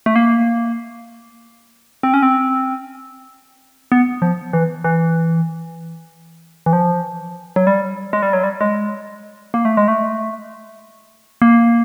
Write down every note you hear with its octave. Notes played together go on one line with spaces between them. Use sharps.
A3
A#3
C4
C#4
C4
B3
F3
E3
E3
E3
F3
F#3
G3
G#3
G3
F#3
G3
G#3
A#3
A3
G#3
A3
A#3